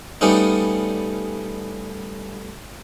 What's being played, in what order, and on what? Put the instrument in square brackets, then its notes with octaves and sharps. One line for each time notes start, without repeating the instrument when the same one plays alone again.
[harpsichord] G3 A3 B3 C#4 D#4